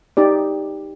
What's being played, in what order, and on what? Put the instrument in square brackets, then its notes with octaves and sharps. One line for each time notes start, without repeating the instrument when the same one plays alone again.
[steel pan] D#4 G4 D5